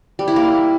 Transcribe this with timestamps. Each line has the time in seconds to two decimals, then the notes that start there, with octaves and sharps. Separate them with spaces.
0.19 G3
0.28 E4
0.36 A#3